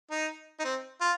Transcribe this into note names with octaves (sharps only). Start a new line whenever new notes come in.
D#4
D#4
C4
F4